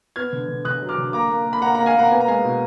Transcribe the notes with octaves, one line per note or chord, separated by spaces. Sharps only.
B3 F6 G#6
D3
D3
D3 D#6 F#6
F#3
D6 F6
D3
A#3 A#5 D6
A#3
A#3
B5
A#3 F#5 A#5
A#3 F#5 A#5
F5 G#5
A#3 F#5 A#5
B3 G#5
A#5
G#3 F5 G#5
B2